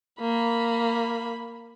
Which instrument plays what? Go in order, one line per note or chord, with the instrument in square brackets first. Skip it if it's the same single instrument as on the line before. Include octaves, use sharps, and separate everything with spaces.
[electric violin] A#3 B5